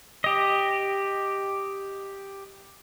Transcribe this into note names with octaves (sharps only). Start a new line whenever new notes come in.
G4 D#5